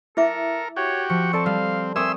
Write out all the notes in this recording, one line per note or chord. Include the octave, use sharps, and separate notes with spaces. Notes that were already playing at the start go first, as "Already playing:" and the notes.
E4 A4 A#4 E5 D6
F#4 G4 C#5
F3 C#6
C4 A4 D5 A5
G3 F5
C4 A#4 E5 G#5 C6 C#6 D#6 E6